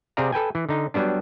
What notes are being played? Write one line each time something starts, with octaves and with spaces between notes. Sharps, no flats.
C3 C4 G#4 D5 F5 A#5
A4 B4 G5 G#5
E3
D3 D#4
F#3 G3 B3 D4